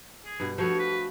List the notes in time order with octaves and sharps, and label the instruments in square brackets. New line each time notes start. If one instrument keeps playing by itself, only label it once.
[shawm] G#4
[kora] G2 B2
[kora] F3 A3 B3 [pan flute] F#4 [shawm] C#5
[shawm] B4